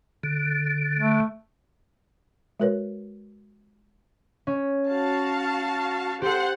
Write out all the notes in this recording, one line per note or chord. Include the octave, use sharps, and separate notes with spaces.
D3
A3
G#3 F#4 A#4 B4 C#5
C#4
F#4 F5 A5
G4 A4 C5 F#5 C6